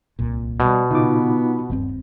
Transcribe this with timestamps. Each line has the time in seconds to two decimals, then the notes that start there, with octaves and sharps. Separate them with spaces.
0.19 D1 C2 A#2
0.60 B2 G3
0.91 A#2 C#3 B3 D#4 F4 D6
1.70 D#1 G2 C3 C4